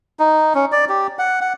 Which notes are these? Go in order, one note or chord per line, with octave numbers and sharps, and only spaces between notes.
D#4
C#4
D5
G4
F#5
F#5